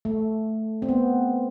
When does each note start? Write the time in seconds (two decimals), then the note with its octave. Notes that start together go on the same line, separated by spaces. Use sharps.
0.05 A3
0.82 C4
0.89 B3